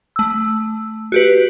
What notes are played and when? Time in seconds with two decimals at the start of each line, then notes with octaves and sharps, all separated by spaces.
0.16 A3 E6
1.12 F#4 G4 B4